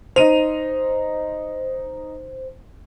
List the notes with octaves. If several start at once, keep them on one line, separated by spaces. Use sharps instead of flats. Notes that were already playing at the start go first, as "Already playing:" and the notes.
D#4 C5 D#7 F7